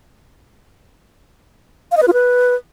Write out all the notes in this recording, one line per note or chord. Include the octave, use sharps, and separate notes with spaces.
F5
D#5
B4
F4
B4